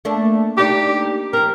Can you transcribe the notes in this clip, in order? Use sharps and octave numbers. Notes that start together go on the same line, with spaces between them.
A3 A#3 D4
A#3 D4 D#4 G4
F3 C4 A#4